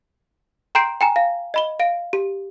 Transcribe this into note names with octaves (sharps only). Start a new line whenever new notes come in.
G5 A#5 C6 G6 C7 D7
G5 G#5 A#5
F5
D#5 B5 G7
F5 D7
G4